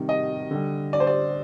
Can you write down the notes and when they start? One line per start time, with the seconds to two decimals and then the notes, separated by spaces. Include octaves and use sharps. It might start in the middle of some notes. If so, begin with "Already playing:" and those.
Already playing: C3 D#3 G3
0.09 D#5
0.51 D3 G3
0.93 D5
1.00 C5
1.07 D5